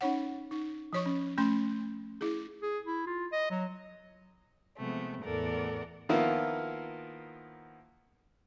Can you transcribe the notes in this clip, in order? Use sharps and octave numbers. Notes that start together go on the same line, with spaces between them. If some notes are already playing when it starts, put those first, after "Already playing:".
C#4 D#4 C#5 F#5
D#4
F3 C#5 C#6
C#4
A3 C#4 C6
E4 G#4
G#4
E4
F4
D#5
F#3
C3 F3 G#3 A3 B3
E2 A2 A4 A#4 D5 F#5
D#3 F3 A#3 B3 E4 F4